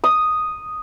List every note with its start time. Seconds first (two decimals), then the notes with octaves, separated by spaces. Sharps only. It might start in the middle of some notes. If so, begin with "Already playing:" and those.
0.04 D#6